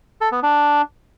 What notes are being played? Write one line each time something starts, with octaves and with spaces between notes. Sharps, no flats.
A4
B3
D4